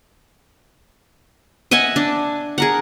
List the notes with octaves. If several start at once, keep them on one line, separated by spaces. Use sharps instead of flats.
D#5 E5 F#5 G#5
D4
G#4 A#4 F#5